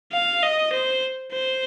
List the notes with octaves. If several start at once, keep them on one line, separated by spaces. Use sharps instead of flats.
F5
D#5
C5
C5